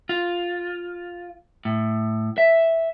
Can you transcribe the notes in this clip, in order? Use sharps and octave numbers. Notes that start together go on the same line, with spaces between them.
F4
A2
E5